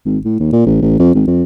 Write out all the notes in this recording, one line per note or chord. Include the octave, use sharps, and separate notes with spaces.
G#1
A2
D#2
A#2
A1
A1
F2
G#1
F2